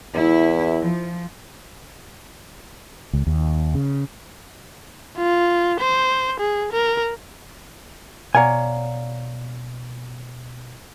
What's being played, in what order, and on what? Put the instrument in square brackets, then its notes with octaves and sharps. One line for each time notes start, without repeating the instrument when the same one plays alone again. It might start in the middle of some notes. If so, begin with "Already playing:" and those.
[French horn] E2 [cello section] E4
[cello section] F3
[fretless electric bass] C#2
D#2
C#3
[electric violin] F4
C5
G#4
A#4
[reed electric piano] B2 [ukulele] C#5 F#5 A#5 [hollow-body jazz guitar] D5 F5 G#5